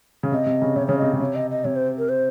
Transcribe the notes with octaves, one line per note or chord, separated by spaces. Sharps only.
C#3
C3 D#5
C3
C#3
C3 C#5
C#3 C#5
C3 D#5
C#3
C3 C#5
D#5
D#5
C3 C#5
C5
A#4
C5